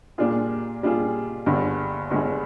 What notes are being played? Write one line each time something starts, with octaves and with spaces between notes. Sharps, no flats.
A#2 G3 D4 F4 G#4
A#2 G3 D4 F4 G#4
G1 G2 D3 G#3
G1 G2 D3 G#3